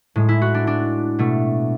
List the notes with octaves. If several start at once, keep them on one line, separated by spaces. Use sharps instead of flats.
A2 G#3
E4
F#4
D4
D4
B2 A3